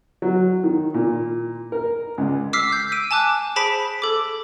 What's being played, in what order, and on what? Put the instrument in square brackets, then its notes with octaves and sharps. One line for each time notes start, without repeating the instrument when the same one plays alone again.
[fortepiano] F#3
D#3
A#2
A#4
C#2
[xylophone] D6 E6 F6 B6 C7
G6
E6 D7 D#7
G#5 A5 D6 F#6
G#4 C5 A5 B5 B6 D7
A4 D6